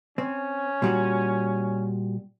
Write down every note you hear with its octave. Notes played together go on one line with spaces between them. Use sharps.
C4 C#4
A#2 G3 F#4